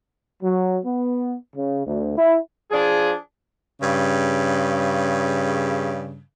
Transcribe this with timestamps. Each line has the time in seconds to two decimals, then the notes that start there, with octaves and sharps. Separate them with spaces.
0.43 F#3
0.84 B3
1.54 C#3
1.86 D2
2.16 E4
2.70 F3 D4 G#4
3.80 G2 C#3